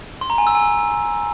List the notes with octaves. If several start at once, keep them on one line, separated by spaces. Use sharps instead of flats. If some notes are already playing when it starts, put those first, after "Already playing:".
C6
A#5
G#5
E6
G#5